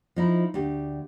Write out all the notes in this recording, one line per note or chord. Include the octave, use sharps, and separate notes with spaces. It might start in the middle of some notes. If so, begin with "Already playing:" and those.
F3 D#4 E4
D2 G4